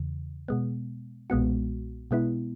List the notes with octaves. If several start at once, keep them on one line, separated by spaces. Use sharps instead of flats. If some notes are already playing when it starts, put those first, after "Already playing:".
Already playing: E2 C#3 E3
B2 G#3 B3
B1 A#2 G#3 B3 F#4
B2 G#3 B3 E4